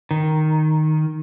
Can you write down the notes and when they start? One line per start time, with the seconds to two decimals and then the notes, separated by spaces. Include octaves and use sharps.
0.11 D#3